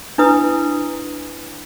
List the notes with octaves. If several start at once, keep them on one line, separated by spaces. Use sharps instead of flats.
D4 E4 B4 D#6